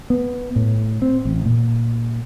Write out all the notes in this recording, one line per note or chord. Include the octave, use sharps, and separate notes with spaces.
B3
A2
C4
A1
A#2